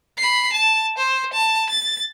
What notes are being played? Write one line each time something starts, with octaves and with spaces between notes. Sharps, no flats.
B5 C7
A5
C5
A5
A6